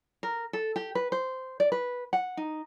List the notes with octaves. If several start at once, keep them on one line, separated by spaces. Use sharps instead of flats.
A#4
A4
G4
B4
C5
D5
B4
F#5
D#4